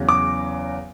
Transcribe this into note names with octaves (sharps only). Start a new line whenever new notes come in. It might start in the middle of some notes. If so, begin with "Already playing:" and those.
Already playing: E2 C#3 F#3
D6